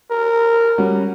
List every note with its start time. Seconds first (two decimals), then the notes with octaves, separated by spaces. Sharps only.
0.11 A#4
0.78 G3 C#4 F#4